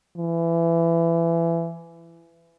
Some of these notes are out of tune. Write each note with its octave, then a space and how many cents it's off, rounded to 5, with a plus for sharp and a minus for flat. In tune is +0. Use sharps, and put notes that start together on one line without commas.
E3 +25